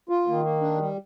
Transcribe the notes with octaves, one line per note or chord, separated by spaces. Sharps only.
F4
D#3 A#3
A#3
D4
G3